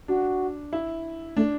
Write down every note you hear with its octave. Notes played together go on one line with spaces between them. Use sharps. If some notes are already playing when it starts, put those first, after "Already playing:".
D4 F#4
E4
A3 D4